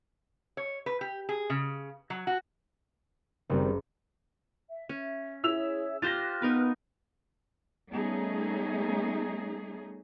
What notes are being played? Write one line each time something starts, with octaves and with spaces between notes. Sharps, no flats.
C#5
B4
G4
G#4
C#3
F#3
F#4
F#1 D#3 G3 C4
E5
C#4 E5
E4 G#4 C#5 E5 E6 F7
F4 G4 C5 F6 F#6 A6 A#6
B3 D#4 A#4 B4
G3 A3 B3 C#4 D#4 G#4